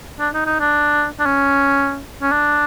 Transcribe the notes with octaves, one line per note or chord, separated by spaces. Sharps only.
D4
D#4
D#4
D4
D4
C#4
C#4
D4